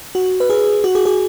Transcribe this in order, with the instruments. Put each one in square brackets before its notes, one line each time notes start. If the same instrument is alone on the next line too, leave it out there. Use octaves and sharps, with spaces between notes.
[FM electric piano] F#4
B4
G#4
F#4
G#4
G#4